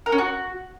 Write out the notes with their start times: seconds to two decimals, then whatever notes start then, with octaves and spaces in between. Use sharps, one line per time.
0.06 A#4
0.12 C#4
0.18 F#4